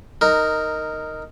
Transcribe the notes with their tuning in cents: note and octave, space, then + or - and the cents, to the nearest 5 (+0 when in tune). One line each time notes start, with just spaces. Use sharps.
D#4 +0 A#4 -10